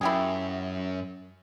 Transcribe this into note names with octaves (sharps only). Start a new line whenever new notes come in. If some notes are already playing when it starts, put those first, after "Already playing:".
F#2 E4 G4 G#4